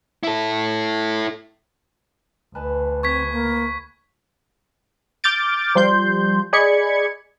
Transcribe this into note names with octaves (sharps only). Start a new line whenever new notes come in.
E4 A4
D2 B4 G#5 A5
C4 C#6 G#6 B6
A#3
D6 F6 G6 A6 D7
F3 G3 C6 G6
G#4 D5 D#5 B5 G#6 C#7